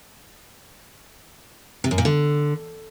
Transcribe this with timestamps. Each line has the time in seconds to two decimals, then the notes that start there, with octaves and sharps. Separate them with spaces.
1.84 C3
1.91 F#2
1.98 A#2
2.05 D3